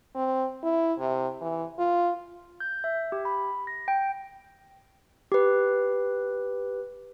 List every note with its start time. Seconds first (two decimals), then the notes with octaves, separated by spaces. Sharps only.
0.15 C4
0.63 E4
0.98 C3
1.41 E3
1.78 F4
2.60 G6
2.84 E5
3.12 G4
3.25 B5
3.67 A#6
3.88 G5
5.32 G4 B4